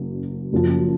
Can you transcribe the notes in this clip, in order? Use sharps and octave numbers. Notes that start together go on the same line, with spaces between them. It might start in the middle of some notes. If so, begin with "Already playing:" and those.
Already playing: F#1 F#2 F#3
F#1 F#2 F3